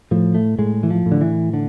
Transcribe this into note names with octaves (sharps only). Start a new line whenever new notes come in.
A2 F3
A3
A2 G#3
E3
F3
A2
D3
E3
D3